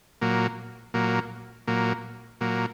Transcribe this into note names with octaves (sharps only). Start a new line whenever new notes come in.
A#2 F#3 A#3
A#2 F#3 A#3
A#2 F#3 A#3
A#2 F#3 A#3